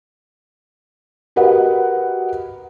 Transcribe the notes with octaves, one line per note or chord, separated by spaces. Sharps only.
F#4 G4 A#4 B4 D#5 F#5